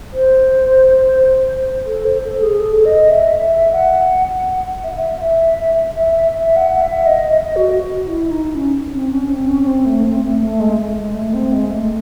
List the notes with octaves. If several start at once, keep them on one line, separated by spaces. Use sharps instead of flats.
C5
A4
C5
A4
G#4
A4
D#5
E5
E5
F#5
E5
F#5
E5
E5
E5
E5
E5
F#5
E5
D#5
D#5
F#4
E4
D#4
C#4
C4
C#4
C4
C#4
C#4
C4
A3
C4
A3
A3
G#3
G#3
A3
C4
G#3
A3